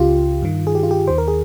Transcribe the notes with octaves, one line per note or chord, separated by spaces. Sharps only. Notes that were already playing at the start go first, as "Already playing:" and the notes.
Already playing: C#2 C#3 F4 G4
G2 D#3
G#4
G4
F4
G4
D#2 D#3 C5
A#4
G#4